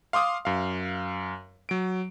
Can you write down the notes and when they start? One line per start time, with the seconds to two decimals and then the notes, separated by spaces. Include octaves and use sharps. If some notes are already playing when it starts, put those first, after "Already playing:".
0.13 F5 C6 D6 D#6
0.45 F#2 F5
1.69 F#3 D7